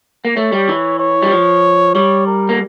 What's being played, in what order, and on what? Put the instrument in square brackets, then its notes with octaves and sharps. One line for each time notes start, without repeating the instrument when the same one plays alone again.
[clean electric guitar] A#3
[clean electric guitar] A3 [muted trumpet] C#5
[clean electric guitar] G3
E3
[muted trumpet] C#5
[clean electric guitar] G3
F3
[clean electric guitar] G3 [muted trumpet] C#5
[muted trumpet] A#4
[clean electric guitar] A#3